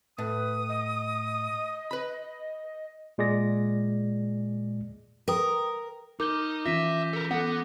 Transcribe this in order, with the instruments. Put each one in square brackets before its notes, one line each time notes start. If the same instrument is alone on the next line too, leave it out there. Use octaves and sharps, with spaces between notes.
[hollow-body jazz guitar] A2 [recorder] B4 [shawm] D#6
[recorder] D#5
[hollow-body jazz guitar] B4 B5
[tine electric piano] A#2 G#3 G#4 D5 A#6
[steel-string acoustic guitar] A#4 [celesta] B4 G5 D#6
[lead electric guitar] D#4 [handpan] A#4 [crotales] D6 G6 G7
[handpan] E3 C#4 F4 [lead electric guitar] E5 [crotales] A#6 B6 D#7
[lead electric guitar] A4 A#4
[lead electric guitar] B3 [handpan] A4 F#5